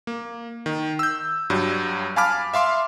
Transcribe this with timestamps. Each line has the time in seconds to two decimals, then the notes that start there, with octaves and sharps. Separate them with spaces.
0.07 A#3
0.66 D#3
0.99 E6 G6
1.50 G2 F#3 G3
2.16 F5 G#5 A5 B5 D6 F6
2.54 E5 F5 C6 D6